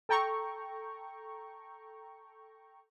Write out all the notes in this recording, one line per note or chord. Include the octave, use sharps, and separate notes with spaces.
A4 G5 A#5 C#6